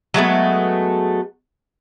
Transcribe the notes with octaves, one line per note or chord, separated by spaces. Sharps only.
F#3 G#3 A3 B3